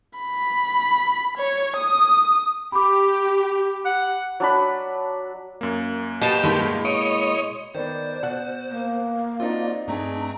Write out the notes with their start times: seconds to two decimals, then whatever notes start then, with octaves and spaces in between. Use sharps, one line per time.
0.19 B5
1.38 C#5
1.77 D#6
2.72 G4 B5 D6
3.85 F#5
4.40 F#3 D4 B5
5.61 F#2 A#3
6.21 B2 G4 A5
6.43 G2 G#3 A#3 E4
6.85 C#5 D#5 D7
7.75 D#3 B3 C5 D5
8.23 B2 F#5 F#6
8.70 A#3
9.40 C4 D4 D#4 F4 F#4 D5
9.88 G2 A3 C4 D4 D#4 G#4 A#5